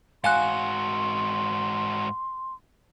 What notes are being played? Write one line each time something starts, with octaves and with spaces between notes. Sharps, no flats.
G#2 F#4 F5 G#5 C6 F#6